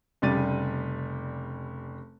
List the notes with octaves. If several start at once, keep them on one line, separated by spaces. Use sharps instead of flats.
F1 C#3 G3 D5 A6 D#7